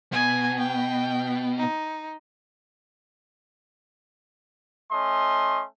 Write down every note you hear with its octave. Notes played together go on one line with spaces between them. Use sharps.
B2 G#5
G5
D#4
A3 C#4 D#5 C6